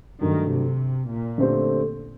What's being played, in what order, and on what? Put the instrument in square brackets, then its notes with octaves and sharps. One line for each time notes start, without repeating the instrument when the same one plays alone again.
[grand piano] G2 F#3 A3 D4 [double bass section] D#3
[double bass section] C3
A#2
[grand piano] D3 A3 C4 G4 C5